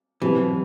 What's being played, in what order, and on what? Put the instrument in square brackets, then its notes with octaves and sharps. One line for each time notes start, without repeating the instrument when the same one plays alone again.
[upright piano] B2 F#3 C4 G4 [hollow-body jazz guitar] E3